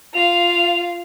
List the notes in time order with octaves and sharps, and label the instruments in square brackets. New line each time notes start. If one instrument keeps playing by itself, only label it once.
[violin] F4 F5 [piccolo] F7